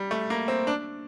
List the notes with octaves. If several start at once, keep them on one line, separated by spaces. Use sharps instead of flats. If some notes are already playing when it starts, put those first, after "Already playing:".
Already playing: G3
A3
A#3
C4
D4